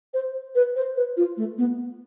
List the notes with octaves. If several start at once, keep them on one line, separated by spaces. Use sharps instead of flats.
C5
B4
C5
B4
F4
A3
B3